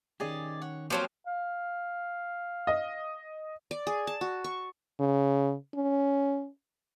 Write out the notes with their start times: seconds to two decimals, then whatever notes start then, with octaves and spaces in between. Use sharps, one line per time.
0.20 D#3 C#4 G4 G#4 D5 D#5
0.62 C#5 F#5
0.90 F3 F#3 A#3 C4 G4 A5 C6
1.27 F5
2.67 D#5
3.71 D5
3.87 G#4
4.07 A5
4.21 F#4
4.44 C#6
5.00 C#3
5.75 C#4